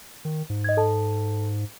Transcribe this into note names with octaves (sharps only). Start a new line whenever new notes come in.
D#3
G#2
D#5 G#6
A4 A5